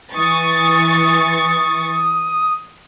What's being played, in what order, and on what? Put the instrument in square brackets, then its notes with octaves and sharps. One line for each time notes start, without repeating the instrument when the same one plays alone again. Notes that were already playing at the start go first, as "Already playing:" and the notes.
[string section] E3 C#6 A6 [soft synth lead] D#6